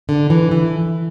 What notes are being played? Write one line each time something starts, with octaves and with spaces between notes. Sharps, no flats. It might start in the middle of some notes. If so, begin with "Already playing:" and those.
D3
E3
E3